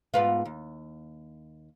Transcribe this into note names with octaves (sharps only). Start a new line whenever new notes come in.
G#2 B3 F4
D#2